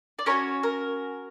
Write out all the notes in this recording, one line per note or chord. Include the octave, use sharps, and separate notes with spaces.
D5
C#4 F#4 A#4 C#5
A#4